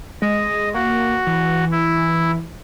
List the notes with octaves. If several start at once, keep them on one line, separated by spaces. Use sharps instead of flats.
G#3 D#5
A#3 F#4
E3
E4